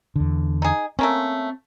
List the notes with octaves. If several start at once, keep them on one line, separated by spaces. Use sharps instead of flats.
E2 D3
D#4 G#4
A3 A#3 C4 C#4